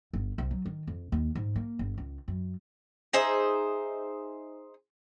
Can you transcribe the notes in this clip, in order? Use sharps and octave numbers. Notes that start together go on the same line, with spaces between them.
G1
C2
F#3
D#3
F2
D#2
G#2
A#3
G1
C#2
F#2
D#4 G#4 C5 E5